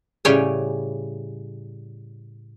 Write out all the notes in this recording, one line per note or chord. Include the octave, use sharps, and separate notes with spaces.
A2 C#3 G3 C#5 G5 G#5